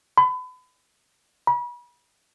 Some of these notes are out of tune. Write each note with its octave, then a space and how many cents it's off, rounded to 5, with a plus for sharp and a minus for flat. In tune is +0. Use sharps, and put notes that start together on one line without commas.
B5 +35
B5 -35